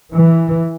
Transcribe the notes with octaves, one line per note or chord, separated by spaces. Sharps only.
E3